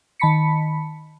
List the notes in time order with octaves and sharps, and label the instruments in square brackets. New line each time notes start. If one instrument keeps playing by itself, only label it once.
[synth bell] D#3 A5 B5 B6 C#7